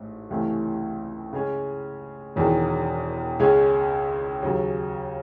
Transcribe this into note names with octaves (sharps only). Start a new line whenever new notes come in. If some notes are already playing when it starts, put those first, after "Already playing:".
Already playing: A1 G#2 A3
C#2 C3 E3 A3 C#4
C#3 G#3 C#4
E1 E2 D#3 G#3
C#2 C#3 G#3 C#4 G#4
D#2 C#3 F#3